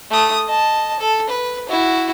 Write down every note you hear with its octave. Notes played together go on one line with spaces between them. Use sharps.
A3 D#6
D#5 A5
A4
B4
E4 F#4